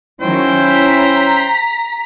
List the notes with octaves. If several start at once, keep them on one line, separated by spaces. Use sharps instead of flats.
D#3 F#3 C#4 E4 C5 G5
A#5 B6